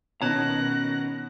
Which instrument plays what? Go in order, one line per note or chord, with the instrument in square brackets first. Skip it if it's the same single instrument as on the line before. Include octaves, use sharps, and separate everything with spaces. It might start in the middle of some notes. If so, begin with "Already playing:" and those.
[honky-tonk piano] B2 D#3 [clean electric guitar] C#4 A#5 [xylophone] C#5 A5 [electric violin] F#6 A#6